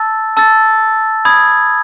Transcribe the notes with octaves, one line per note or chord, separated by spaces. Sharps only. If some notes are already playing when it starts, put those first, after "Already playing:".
Already playing: A5 E6 A6
A5 E6 A6
B5 D#6 G#6